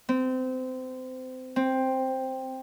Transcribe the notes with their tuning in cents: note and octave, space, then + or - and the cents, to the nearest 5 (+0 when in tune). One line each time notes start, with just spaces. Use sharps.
C4 -25
C4 +5